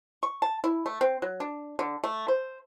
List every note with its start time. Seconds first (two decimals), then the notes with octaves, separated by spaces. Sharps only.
0.23 C#6
0.42 A5
0.64 E4
0.86 A3
1.01 C4
1.22 F#3
1.40 D4
1.79 D3
2.04 A3
2.28 C5